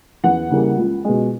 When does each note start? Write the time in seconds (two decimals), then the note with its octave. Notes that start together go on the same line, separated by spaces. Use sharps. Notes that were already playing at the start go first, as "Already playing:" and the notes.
0.24 E2 F#5
0.50 C#3 E3 G3 A#3
0.77 C#2
1.05 B2 G#3